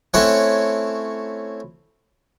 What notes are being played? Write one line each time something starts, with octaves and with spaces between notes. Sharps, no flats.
A3 C4 C#4 E4 C#5 F#5